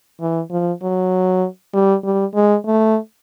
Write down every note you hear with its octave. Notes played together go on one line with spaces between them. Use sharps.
E3
F3
F#3
G3
G3
G#3
A3